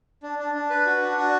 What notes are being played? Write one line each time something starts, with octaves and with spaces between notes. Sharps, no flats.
D4
D4
D4
B4
F#4
D4
F#4